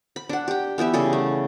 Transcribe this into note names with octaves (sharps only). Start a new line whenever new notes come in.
B5
D4 F#5
G4 G5
E3 B3 G4 E5
C#3 G3 G#4 A4
A3